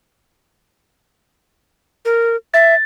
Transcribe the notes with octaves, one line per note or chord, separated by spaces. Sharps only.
A#4
E5 A6